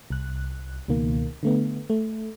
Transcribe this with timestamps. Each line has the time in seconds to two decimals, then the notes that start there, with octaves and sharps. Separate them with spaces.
0.10 C2 F#6
0.88 C#2 B2 D#3 A#3
1.43 D3 A3 B3
1.90 A3